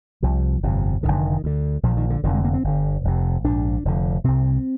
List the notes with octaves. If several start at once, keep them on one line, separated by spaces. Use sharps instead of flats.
C2 C3 F3
G1 F2 C3
F1 D#2 D3 D#3
D2 D3
A#1 A#2 F3
D#3
D3
F1 F2 D3 D#3
G#3
A#3
C4
G1 G2 D3
F1 F2 C3
A#1 G#2 D4
F1 F2 D3
C2 C3 C4